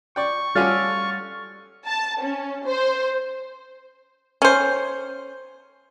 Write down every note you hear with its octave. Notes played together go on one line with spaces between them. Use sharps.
D5 G5 C#6
G3 C#4 F4 F#4 A4 D5 F6 A6
A5
C#4
C5
C#4 C5